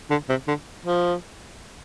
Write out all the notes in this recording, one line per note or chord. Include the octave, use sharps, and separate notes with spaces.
D3
C3
D3
F3